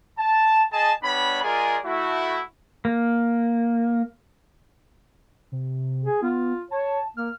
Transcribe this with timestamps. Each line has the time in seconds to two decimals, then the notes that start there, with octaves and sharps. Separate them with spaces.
0.17 A5
0.71 G#4 D#5 G#5 A5
1.02 G3 B3 D4 C#5 B5
1.42 G#3 F4 G#4 A#4 D5 G#5
1.84 A3 E4 F#4
2.85 A#3
5.52 C3
6.04 G#4
6.22 B3 F4
6.71 C#5 A5
7.17 A#3 F6